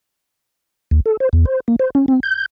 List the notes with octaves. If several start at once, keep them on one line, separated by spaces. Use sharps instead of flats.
D#2
A4
C5
E2
C5
A#3
C5
C#4
C4
G6